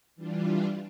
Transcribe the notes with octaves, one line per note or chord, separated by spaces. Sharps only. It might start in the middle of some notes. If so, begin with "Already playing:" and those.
E3 G3 D4 F4